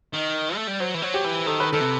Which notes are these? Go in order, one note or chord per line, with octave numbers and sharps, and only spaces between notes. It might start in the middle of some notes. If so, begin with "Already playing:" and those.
D#3
A3
G3
F#3 C5
E3
F#3
G4
E3
D#3 A4
B4
D#3 A4
C3